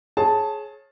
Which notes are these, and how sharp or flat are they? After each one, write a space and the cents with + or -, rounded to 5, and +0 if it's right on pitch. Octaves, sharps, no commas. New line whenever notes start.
G#4 +20 C#5 -25 A5 +0